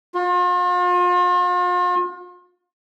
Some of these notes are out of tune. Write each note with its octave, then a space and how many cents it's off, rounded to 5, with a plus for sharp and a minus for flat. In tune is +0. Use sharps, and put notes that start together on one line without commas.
F4 +40